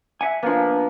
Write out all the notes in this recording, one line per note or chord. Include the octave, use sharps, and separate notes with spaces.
E5 F#5 G#5
F3 A#3 B3 D4